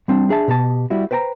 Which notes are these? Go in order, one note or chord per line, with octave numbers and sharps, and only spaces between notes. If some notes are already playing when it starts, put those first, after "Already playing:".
G3 C4 D4
D4 G#4 E5 A5
B2 G4 A5
G3 E4 F#4
B4 C5 G5 A5 A#5